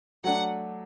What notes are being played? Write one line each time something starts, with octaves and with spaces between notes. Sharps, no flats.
F#3 A3 D4 F#5